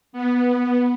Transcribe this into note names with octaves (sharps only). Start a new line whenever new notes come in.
B3